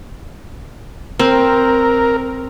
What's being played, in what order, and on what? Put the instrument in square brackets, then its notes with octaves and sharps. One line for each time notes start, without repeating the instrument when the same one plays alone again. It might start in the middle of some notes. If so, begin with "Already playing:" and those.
[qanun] C4 [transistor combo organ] A#4